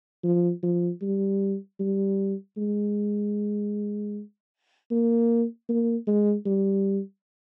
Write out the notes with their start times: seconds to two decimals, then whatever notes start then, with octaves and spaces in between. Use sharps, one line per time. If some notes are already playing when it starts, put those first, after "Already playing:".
0.24 F3
0.63 F3
1.02 G3
1.80 G3
2.57 G#3
4.91 A#3
5.69 A#3
6.07 G#3
6.46 G3